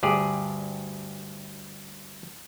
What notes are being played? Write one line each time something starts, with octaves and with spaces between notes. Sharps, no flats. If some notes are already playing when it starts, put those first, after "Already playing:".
D2 G2 G4 G#4 D5